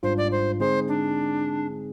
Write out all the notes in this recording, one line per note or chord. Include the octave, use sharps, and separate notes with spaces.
G#1 G#2 G3 D4 F4 C5
D5
C5
D3 G#3 C4 D#4 G#4 C5
D4